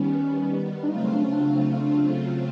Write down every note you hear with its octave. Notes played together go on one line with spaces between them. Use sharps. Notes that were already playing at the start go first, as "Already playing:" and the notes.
Already playing: D#3 G3 B3 C#4
D4
C#3 F#3 A3 C4 D#4 F4
D4
C#4
D4